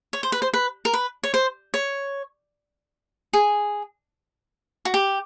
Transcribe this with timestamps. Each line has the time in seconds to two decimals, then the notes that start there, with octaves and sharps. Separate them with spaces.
0.13 C#5
0.23 C5
0.32 B4
0.42 C5
0.54 B4
0.85 A#4
0.93 B4
1.24 C#5
1.34 C5
1.74 C#5
3.33 G#4
4.85 F#4
4.94 G4